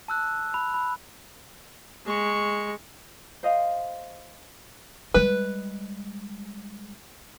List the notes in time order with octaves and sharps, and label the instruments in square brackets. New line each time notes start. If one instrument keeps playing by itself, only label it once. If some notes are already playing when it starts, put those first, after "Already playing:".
[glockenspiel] A5 E6 F#6
B5
B5
[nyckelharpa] G#3 C#6
[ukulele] C5 D#5 F5
[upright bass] G3 G#3 [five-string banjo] B4